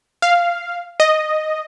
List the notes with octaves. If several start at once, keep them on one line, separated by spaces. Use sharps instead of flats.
F5
D#5